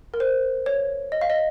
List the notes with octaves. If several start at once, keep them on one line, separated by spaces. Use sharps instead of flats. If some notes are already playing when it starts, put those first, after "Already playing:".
A#4
C5
C#5
D#5
F5
D#5